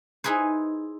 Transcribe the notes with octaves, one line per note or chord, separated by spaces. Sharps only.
D#4 E4 G#4 B4 C5